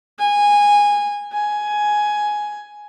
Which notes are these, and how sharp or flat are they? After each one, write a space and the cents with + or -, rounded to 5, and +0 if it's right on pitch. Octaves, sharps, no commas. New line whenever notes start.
G#5 -15
G#5 +10